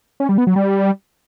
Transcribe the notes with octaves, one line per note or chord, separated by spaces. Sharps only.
C#4
G3
B3
F#3
G3